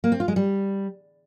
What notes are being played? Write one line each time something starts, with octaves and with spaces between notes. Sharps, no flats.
A#3
C4
F4
G#3
G3